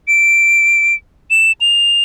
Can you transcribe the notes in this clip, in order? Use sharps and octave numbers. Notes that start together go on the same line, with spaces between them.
D7
E7
F7